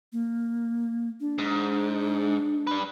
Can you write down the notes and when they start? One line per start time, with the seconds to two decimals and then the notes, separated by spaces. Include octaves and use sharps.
0.13 A#3
1.20 D4
1.38 G#2
2.67 G3 B4